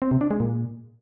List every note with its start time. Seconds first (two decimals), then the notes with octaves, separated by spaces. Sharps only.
0.02 C4
0.11 C3
0.21 D4
0.31 G#3
0.40 A#2